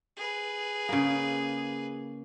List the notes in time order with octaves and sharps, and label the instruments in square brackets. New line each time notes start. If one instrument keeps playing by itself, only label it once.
[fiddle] G#4 B4
[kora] C#3 A#3